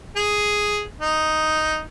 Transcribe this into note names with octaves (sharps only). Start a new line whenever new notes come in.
G#4
D#4